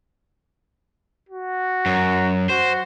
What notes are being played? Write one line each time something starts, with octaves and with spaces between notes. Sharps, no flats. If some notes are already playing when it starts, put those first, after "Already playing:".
F#4
F#2
F#4 C5